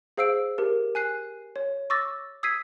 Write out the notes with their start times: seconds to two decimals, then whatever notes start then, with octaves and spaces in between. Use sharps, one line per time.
0.17 G#4 C5 F5 E6 C7 D7
0.58 G4 A#4
0.95 G#5 F#6 C7
1.56 C#5
1.90 C#6 D6 E6 A6 A#6
2.43 D#6 E6 G#6 B6 C7 D#7